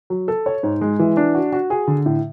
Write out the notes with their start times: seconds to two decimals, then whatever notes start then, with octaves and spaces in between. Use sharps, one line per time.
0.10 F#3
0.28 A4
0.46 C#5
0.63 G#2
0.81 G#3
0.99 E3
1.17 D4
1.35 F#4
1.53 F#4
1.70 G#4
1.87 D3
2.06 A2